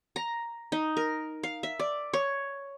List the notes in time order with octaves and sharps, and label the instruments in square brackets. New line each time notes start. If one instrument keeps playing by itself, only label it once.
[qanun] A#5
D#4
A#4
F5
E5
D5
C#5